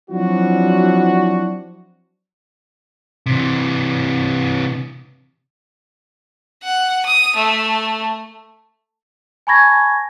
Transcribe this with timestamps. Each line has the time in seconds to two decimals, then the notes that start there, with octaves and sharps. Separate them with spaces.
0.10 F3 F#3 C4 D4 E4 F#4
3.26 C3 E3
6.63 F#5
7.06 D#6
7.36 A3
9.47 G#5 A5 B5 C#6 G#6 A#6